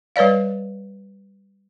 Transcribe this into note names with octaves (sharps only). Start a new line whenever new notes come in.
G3 B4 C#5 D5 F5